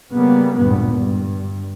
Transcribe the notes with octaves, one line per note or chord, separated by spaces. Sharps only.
C#3 G3 A#3 B3
G#1 D2 G2 A#2 B3
G2